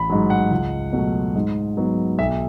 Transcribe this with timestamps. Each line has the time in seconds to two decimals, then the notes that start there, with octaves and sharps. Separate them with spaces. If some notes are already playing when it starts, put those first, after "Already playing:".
Already playing: A1 B5
0.10 G#2 F#3
0.30 F#5
0.51 C#2
0.93 B2 F#3 A3
1.35 G#2
1.77 F#3 B3 D#4
2.18 B1 E5